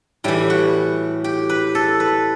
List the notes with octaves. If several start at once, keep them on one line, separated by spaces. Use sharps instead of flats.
A2 E3 G3
F#4
G4
B4
A4
B4